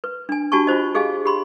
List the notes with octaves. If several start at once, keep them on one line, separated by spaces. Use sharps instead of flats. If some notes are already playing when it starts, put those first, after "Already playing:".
B4
D4 G#5
D4 F#4 G4 G#5 A5 C#6
F4 F#4 C5 D#5
G4 G#4 D#5 F5 G#5
G4 B5 C6